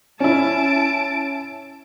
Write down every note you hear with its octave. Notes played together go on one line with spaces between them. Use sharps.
C#4 E4 A5 D7